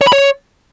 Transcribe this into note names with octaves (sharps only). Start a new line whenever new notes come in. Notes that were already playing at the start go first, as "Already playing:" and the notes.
C#5
B5
C#5